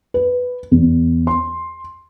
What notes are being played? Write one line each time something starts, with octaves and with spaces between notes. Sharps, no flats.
B4
E2
C6